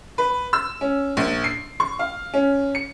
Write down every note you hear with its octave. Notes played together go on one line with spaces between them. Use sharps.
B4
E6
C#4
A#1
C7
C#6
F5
C#4
C#7